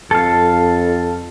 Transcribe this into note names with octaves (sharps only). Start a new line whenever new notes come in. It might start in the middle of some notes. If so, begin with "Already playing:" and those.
F2 A4 F5